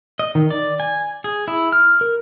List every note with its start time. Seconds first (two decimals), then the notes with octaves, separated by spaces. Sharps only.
0.19 D#5
0.35 D#3
0.50 D5
0.80 G#5
1.24 G#4
1.48 E4
1.72 F6
2.01 A#4